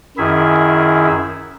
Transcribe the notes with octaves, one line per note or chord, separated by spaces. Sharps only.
F#2 D#3 E4 G#4 E5